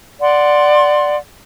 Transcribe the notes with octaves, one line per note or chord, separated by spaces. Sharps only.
D5 F#5 C6